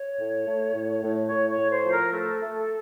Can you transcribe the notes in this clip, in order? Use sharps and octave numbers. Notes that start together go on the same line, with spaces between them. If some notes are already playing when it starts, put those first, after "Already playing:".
Already playing: C#5
A2
A3
A2
A2
A2 C#5
C#5
A2
C5
F3
A#4
A3 A4
A3